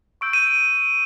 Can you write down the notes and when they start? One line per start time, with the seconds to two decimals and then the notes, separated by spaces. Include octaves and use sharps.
0.21 C#6 E6 G6 D7
0.33 D#7